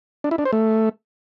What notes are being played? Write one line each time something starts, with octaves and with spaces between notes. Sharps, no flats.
D4
E4
D4
C5
A3